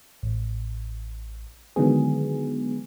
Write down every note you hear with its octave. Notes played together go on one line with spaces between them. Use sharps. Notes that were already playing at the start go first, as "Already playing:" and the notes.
A1
D3 D#3 F#3 G#3 B3 G#4